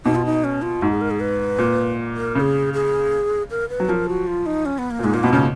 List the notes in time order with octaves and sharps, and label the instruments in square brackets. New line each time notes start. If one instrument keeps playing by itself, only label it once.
[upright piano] B2 [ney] D#4
[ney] F4
D#4
C#4
F4
[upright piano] G#2 [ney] F#4
[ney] G#4
A#4
G#4
B4
[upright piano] A#2
[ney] A#4
[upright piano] C#3 [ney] A#4
[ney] G#4
G#4
A#4
B4
[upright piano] F#3
[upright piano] F3 [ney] A#4
[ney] F#4
F4
D#4
C#4
B3
A#3
[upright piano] A#2
[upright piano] G#2 [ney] G#3
[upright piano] A#2 [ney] A#3
[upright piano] B2 [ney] B3
[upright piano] C#3 [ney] C#4